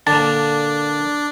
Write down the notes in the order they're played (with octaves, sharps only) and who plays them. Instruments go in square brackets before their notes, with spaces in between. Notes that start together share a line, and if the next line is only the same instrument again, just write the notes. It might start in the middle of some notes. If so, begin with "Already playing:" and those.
[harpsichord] A#2 D3 [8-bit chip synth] D4 [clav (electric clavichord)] A5